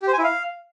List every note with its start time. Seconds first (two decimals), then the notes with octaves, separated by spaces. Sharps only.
0.02 G4
0.08 C5
0.13 G#5
0.18 E4
0.24 F5